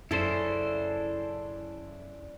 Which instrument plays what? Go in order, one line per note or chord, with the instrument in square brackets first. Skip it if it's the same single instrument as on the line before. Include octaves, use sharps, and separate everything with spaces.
[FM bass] F#2 [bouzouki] C#3 D4 [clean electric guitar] E4 A4 C5